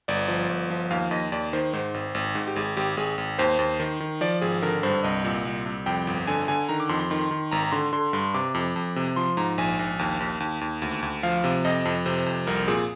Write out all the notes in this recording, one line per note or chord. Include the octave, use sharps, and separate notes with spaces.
G1 D5
F3
G1
F3
D#2 F5
D#2 D#5
D#2 D5
D#3 C5
G#2 C5
G#1
G#1
G#2
G4
G#1 G#4
G#1 G4
G#1 G#4
G#1
D#2 C5
D#2
D#3
D#3
F3 D5
G#1 G#4
D3 A#4
G2 C5
C2 D#5
A#2
C2
C2
F2 G5
G1
D3 G#5
D3 G#5
D#3 A#5
D6
F2 C6
C6
D#3 C6
D#3
G#1 A#5
A#5
D3 C6
D3 C6
G2 C6
C3 D6
F2
F2
C3
F3 C6
G#2 A#5
A#1 G#5
A#1
D#2
D#2
D#2
D#2
D2
D2
F3 F5
C3
F2 D#5
F2
C3 C5
F2
C2 A#4
A#2 G#4